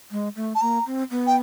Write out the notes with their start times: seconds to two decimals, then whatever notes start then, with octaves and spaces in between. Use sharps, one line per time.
0.11 G#3
0.36 A3
0.55 A5
0.61 A#3 A#5
0.86 C4
1.11 B3
1.27 G5